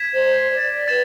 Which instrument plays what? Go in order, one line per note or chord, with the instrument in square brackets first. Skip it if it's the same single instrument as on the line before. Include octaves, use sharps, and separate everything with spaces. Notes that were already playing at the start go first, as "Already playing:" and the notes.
Already playing: [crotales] G#6 B6 E7
[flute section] C5
D5
[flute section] B4 [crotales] A6 E7